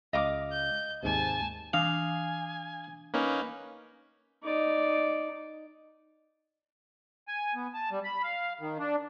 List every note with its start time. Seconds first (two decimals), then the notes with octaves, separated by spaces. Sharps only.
0.13 C#2 D#5 F5 D6
0.52 G6
1.03 D#2 G#2 C3 G#5 A5
1.73 E3 D4 F5 G#5 D#6
3.14 A#3 C#4 D#4 B4
4.43 D#4 D5
7.28 G#5
7.55 B3
7.74 A5
7.91 G3
8.04 B5
8.23 F5
8.60 D#3
8.79 D4